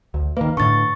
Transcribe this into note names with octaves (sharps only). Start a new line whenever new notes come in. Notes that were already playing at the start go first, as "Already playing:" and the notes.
D2
D#3 A#3 B4
A2 D3 C#6 A6